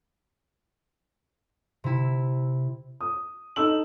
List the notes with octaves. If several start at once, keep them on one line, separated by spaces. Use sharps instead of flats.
C3 E4
D#6
D#4 A4 E6 F#7